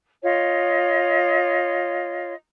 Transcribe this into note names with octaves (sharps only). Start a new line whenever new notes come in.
F4 C#5 D#5